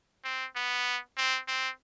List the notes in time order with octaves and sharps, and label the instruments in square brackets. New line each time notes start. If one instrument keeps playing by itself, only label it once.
[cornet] C4
B3
C4
C4